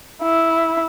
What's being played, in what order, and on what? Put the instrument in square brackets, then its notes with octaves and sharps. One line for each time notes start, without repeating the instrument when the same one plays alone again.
[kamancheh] E4